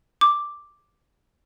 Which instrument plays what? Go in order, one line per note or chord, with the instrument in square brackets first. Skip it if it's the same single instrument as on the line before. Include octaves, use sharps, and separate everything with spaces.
[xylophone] D6